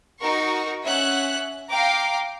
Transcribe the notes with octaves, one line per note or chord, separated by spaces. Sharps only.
D#4 F#4 A#4 C#6
C#4 E5 F#5 F#6
F5 G5 A#5 D6